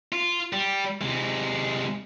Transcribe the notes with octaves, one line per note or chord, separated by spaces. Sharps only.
F4
G3
C3 G#3